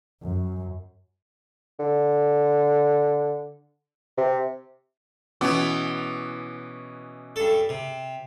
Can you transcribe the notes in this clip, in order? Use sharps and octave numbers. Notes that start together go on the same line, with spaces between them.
F#2
D3
C3
B2 E3 B3 C#4 D6
G2 A4
C3